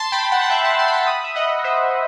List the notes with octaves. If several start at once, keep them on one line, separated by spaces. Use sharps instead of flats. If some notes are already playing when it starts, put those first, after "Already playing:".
Already playing: A5 C6
G5 B5
F#5 A5
A5
E5 G5
F#5 A5
A5 C6
B5
A5 C6
B5 D#6
E5
D#5 F#5
C5 E5